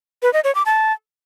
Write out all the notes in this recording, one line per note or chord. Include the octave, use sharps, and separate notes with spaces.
B4
D#5
C#5
D6
A5